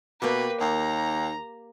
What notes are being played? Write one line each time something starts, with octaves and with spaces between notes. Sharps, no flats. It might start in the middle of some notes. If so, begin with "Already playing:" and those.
B2 A#3 G4 B4
D#2 A#5